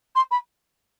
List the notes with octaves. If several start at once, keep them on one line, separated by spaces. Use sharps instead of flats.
C6
B5